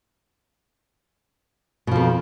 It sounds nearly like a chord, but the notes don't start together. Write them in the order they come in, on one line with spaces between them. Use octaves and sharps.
B2 F3 F2